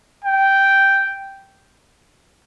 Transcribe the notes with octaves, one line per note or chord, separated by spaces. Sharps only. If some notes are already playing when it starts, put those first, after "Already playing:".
G5